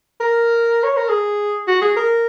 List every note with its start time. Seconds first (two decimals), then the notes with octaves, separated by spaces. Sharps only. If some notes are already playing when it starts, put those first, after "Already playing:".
0.20 A#4
0.84 C#5
0.97 A#4
1.09 G#4
1.67 F#4
1.82 G#4
1.96 A#4